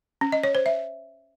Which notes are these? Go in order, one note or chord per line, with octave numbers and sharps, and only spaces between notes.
C#4
D#5
C#5
C5
E5